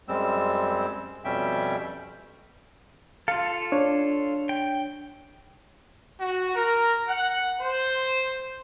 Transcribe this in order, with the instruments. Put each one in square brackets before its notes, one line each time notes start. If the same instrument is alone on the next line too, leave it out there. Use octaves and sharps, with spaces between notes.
[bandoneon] F#2 G3 G#3 C4 E6
F2 B2 G3 C#4 E5 G5
[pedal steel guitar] F4 A4 [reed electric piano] F5
[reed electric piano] D4 C#5
[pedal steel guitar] G5
[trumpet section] F#4
A#4
F#5
C5